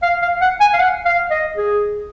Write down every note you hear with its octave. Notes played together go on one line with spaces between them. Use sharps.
F5
F5
F#5
G#5
F5
F#5
F5
D#5
G#4